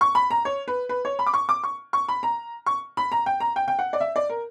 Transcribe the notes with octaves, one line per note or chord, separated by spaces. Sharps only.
C#6
B5
A#5
C#5
B4
B4
C#5
B5
D6
C#6
D6
C#6
C#6
B5
A#5
C#6
B5
A#5
G5
A#5
G5
G5
F#5
D5
E5
D5
A#4